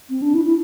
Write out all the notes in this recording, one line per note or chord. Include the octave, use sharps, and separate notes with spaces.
C4
D4
E4
E4